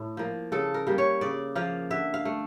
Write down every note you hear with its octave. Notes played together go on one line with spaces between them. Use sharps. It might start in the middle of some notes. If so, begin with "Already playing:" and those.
Already playing: A2
F3 A#3
C#3 A4
A#4
G3 A#3
C#5
C#3 D5
F3 A#3 F5
D3 E5
F5
A3